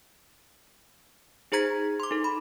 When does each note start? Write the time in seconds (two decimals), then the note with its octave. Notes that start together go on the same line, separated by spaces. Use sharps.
1.52 D#4 G#4 C5 A#5 G#6 B6
2.00 C6 D6
2.11 D#4 A4
2.24 B5